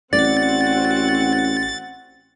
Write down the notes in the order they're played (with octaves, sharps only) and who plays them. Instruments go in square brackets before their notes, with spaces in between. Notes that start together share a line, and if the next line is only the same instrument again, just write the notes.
[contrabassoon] A1 [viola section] C4 F#4 F#5 [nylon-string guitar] D5 [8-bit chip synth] A6